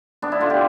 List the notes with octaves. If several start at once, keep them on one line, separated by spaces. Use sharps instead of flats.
B3 D4
E4
D3 F4
G4